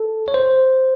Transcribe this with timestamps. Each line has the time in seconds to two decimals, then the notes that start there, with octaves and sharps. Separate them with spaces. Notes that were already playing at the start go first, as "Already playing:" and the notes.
Already playing: A4
0.28 C#5
0.34 C5